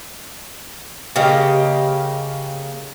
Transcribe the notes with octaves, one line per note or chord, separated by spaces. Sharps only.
C#3 A#3 G4 D#5